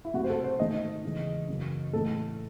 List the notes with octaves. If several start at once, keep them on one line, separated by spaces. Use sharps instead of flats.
E4
C3 F#3 A3 F#4
C5
A4
C5
G#2 D#3 A3 D#5
E2 C#3 E3 G#3
F#2 C#3 E3
A2 E3 A3 A4